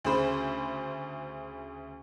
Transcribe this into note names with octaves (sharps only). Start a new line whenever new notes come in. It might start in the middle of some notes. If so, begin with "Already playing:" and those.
D2 C#3 G#4 C5 B5